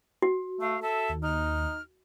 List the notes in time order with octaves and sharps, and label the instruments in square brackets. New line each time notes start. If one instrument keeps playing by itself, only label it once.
[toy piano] F#4
[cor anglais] A3 [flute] F5
[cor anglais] A4 [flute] E5
[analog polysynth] D#2
[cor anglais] D#4 [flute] F6